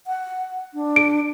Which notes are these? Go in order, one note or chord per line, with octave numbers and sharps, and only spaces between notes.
F#5
D4
D7